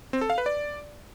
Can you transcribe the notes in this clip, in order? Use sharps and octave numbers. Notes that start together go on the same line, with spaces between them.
C4
A4
F5
B4
D5